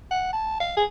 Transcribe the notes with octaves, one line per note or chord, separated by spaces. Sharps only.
F#5
A5
F5
G#4